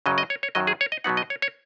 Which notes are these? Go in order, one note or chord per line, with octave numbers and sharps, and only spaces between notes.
F#2 C#3 F#3 D#5
D#5
C#5
C#5
F#2 D#3 F#3 D#5
G#4
C#5
D#5
B2 F#3 B3 D#4 F#5
D#5
C#5
C#5